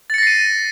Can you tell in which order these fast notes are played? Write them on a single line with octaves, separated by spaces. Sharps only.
A6 C#7 A#6 C7 D#7